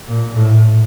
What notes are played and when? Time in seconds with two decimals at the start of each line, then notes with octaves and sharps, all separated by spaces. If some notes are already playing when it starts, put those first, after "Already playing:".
0.08 A#2
0.37 A2